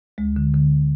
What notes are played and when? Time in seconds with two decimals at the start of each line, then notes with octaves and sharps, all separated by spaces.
0.18 D2 G#3
0.36 D3
0.54 D3